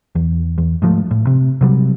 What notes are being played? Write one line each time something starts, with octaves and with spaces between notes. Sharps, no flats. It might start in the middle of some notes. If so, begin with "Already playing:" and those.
E2
E2
G#2 F3 A3
A2
C3
C3 F#3 G3